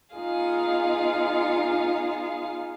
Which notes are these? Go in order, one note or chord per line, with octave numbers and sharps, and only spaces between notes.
B3 D#4 F4 G#4 F5